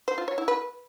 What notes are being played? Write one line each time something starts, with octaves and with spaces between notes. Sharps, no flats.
C5
F4
C#5
E4
B4